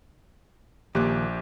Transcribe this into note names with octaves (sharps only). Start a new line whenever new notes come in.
A#1 D#2 A#2 G4 F#6